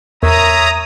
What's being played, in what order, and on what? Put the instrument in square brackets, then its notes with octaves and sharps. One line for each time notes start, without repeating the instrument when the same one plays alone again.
[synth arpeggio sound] E2 A#4 [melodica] C#5 E5 [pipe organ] A#5 D#6